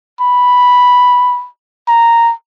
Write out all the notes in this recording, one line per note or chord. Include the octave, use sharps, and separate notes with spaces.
B5
A#5